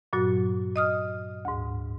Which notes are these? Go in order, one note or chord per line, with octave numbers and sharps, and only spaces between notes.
G2 A#2 F#3 F#4
D#5 D#6 F6
D2 G#2